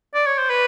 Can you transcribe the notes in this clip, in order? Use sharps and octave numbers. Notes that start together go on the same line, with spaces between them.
D5
C#5
C5
B4